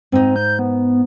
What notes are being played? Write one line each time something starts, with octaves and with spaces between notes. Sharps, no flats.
G#2 C4 D#4
G6
B3